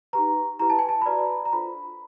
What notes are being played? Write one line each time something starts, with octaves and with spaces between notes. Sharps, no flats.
D#4 G4 B4 A#5
E4 G4 B4 A#5
A5
G#5
A5
B5
F#4 B4 D5 A#5
A#5
D4 F4 A4 C5 B5